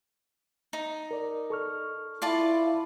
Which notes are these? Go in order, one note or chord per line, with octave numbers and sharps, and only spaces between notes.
D#4
A#4 D5
A4 C#6 F6
E4 F4 D5 A5